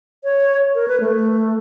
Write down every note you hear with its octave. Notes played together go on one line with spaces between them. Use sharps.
C#5
A#4
B4
A3